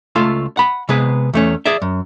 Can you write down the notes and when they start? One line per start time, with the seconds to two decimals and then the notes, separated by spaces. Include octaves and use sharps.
0.16 C#2 A3 F4 A4
0.57 F#5 B5
0.89 C3 G#3 B3 G#4 B4
1.33 E2 A3 C#4
1.66 G#4 D5 E5
1.82 F#2